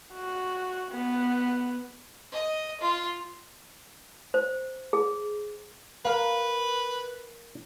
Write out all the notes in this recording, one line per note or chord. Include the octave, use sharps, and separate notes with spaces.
F#4
B3
D#5
F4
C5
G#4
A#4 B4 F5